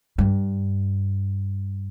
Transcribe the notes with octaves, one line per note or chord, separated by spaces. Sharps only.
G2